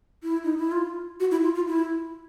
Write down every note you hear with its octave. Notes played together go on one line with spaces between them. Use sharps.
E4
D#4
E4
F4
F#4
E4
F4
F4
E4